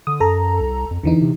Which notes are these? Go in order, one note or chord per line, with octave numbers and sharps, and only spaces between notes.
D3 D#6
F#2 A4 A#5
C2
F2
E2 D3 E3 D#4
C3